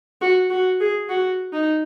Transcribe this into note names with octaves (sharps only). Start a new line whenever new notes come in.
F#4
F#4
G#4
F#4
D#4